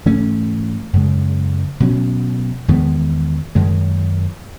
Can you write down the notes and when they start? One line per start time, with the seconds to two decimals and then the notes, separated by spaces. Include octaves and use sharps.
0.06 G#2 E3 A3 C#4
0.93 F#2 C#3 G#3
1.80 B2 F#3 C#4
2.68 E2 D#3 G#3 B3
3.55 F#2 D#3 G#3